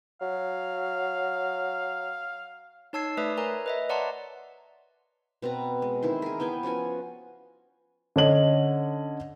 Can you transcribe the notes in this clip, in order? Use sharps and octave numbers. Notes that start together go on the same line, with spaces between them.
F#3 F5
D#4 C#5 A5 E6 G#6 C7
A3 B4 D5 E5 D#6
A#4 C#5 G#5 A#5
B4 D#5 E5
C#5 D5 F#5 A5 A#5 C6
B2 C4 B4 A#5
G#3
D#3 E3 E4 C5
G#4 A#4
B3 E4 G5 G#5
F3 C#4 F#4 G#5
D3 C#4 D#5 F#7